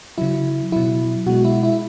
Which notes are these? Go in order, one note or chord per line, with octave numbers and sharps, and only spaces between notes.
C#3 F#3 E4
B2 F#3 E4
B2 G#3 F#4
E4
E4